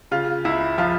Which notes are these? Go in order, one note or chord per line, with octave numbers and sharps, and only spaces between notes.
C#3 F4
C#2 E4
F3 F4